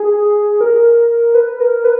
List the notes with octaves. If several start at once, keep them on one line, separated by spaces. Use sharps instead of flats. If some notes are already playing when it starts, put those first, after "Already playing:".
Already playing: G#4
A#4
B4
A#4
B4